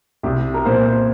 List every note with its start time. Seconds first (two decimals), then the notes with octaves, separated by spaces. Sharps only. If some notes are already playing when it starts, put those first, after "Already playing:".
0.23 C2 G4
0.54 A#4
0.65 A#2 C5
0.85 C5